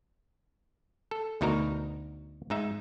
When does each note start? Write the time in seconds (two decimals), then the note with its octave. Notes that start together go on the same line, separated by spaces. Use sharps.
1.11 A4
1.41 D2 B2 D#4 F#4 A#4 A#5
2.50 G#2 D#4 E5